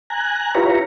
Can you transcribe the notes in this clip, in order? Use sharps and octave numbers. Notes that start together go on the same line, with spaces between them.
G#5 A#5 F#6
E4 F4 G4 B4 C#5 A#5